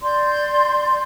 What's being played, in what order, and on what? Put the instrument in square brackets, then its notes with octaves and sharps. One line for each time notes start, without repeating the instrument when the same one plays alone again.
[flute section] D5 C6 G6